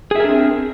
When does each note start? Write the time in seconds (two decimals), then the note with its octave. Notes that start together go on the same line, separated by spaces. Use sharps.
0.11 G#4
0.16 E5
0.20 A#4
0.24 D4
0.29 C4